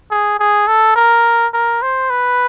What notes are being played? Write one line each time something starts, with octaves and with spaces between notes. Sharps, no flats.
G#4
G#4
A4
A#4
A#4
C5
B4